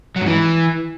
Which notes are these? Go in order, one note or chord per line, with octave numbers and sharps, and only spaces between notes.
F#3
G#2
E3